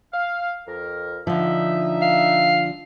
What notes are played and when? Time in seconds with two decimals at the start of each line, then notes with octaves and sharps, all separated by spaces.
0.14 F5
0.67 F2 A#4
1.27 D3 F3 D#4 E5
2.02 F5